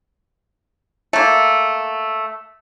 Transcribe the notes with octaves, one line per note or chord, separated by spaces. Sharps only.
A3 A#3